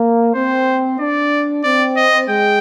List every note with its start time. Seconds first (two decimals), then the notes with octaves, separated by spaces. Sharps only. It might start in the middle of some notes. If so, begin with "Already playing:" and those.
Already playing: A#3
0.35 C4 C5
0.99 D4 D5
1.64 C4 D5
1.96 D#5
2.28 G#3 G5